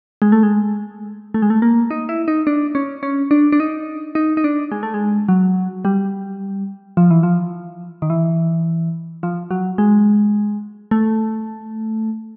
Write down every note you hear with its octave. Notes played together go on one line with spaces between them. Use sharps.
G#3
A3
G#3
A3
G#3
A3
A#3
D#4
E4
D#4
D4
C#4
C#4
D4
D4
D#4
D#4
D#4
D4
G#3
A3
G#3
F#3
G3
F3
E3
F3
D#3
E3
F3
F#3
G#3
A3